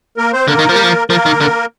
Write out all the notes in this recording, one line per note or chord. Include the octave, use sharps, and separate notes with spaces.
A#3 A#4
C4 C5
D3 A#3 A#4
D#3
F3
G3
F3
F3 A#3 A#4
D#3
D3